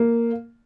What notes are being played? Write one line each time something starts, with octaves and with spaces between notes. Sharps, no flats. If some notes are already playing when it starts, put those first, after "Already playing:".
Already playing: A#3